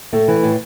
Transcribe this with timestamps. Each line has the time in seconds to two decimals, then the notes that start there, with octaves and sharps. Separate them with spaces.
0.13 A2 A3
0.28 E3
0.43 A2